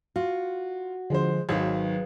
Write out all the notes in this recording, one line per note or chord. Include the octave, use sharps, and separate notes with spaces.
F4 F#4
D3 F3 G#3 C5
G#1 D#3 F#3 G#4 B4 F5